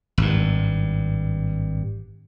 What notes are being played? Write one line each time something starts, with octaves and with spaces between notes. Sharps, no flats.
G#1 G2